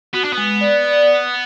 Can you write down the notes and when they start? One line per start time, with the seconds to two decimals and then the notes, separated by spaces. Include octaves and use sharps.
0.14 B3 F#4
0.24 D4
0.33 G#3 B3
0.61 D5
0.85 D5